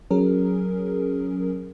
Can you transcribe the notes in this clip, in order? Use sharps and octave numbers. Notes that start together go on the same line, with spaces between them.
F#3 C#4 G#4 A#4